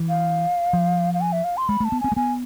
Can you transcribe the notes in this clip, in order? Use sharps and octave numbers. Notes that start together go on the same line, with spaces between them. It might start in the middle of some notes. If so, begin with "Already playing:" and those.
Already playing: E3
F5
F3
F5
G#5
E5
F5
C6
G#3 B5
A3
A5
B3
C4 G#5
A3
B3 G#5